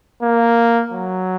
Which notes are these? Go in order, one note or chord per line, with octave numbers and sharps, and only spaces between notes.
A#3
F#3